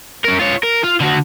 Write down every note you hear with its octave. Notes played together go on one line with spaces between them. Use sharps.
C#4 A#4
F4 C#5
A#4
F4
D3 F#4